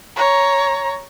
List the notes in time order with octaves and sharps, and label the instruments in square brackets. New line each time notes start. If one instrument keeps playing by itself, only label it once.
[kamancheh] C#5 A#5